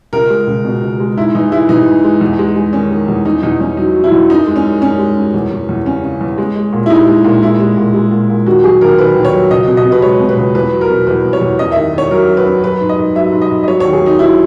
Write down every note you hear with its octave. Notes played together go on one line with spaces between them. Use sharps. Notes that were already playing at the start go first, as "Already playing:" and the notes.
C#2 A#4
G#3
C#2
B2
C#2
G#3
G#2 E4
E3 D#4
G#3 E4
E3 D#4
G#2
G#3
E2
G#3
G#3
D#3 C#4
D#3
E2
E2 D#4
E2 D#4
E2 C#4
F#3 D#4
F#3
E4
E2
F#2 D#4
G#3
C#4
F#2
F#2 C#4
G#3
F#2
E2
E2
E2
C#3 C#4
C#3
E2
G#3
G#3
A#2
E4
G#3 D#4
G#3
A#2
G#3 E4
G#3
A#2
G#3
A#2
A#2
D#2 F#4
F#3 G#4
D#2 A#4
D#2 B4
D#2
C#5
F#3
C#2 D#5
B2
D#5
B2
B4
G#3 C#5
B2
B4
C#2
E2 B4
F#3
A#4
B2
E2 B4
E2
C#5
E2
F#2 D#5
D#3 E5
D#3 C#5
F#3 A#4
F#2
B4
F#2
F#3 B4
G#2
D#5
G#2
F#3 E5
G#2
D#5
G#2
D#5
F#3 C#5
D#2 C#5
G#4
F#3 D#4
F#3 E4